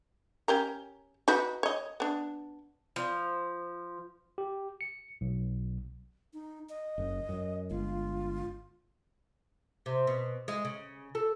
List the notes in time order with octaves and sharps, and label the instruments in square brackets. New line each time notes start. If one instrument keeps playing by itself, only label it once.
[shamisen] C#4 G4 A#4
D#4 F#4 B4
C#5 D#5
B3 D4
[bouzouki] F3
[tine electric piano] G4
C#7
B1
[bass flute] D#4
D#5
[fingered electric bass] F#1 F#2
F#2
[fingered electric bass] G1 G#3 [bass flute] F4
[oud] C3
B2
G#3
C#3
A4